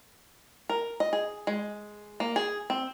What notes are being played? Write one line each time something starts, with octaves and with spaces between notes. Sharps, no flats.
A#4
D#5
G#4
G#3
A#3
G#4
C4